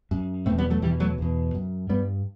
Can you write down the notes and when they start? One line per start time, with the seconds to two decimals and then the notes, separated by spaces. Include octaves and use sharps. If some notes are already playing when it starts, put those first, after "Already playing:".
0.11 F#2
0.46 B2 A3 C4
0.50 E2
0.58 G3 B3
0.70 F#3 A3
0.82 E2 B2 E3 G3
1.00 F#3 A3
1.18 E2 B2
1.55 F#2
1.89 G2 G3 B3